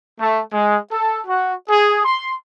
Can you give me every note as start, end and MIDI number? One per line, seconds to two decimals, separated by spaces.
0.20 0.41 57
0.53 0.77 56
0.91 1.19 69
1.27 1.53 66
1.69 2.02 68
2.05 2.34 84